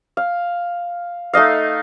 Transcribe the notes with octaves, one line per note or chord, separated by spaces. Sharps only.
F5
A3 D#4 D#5 F5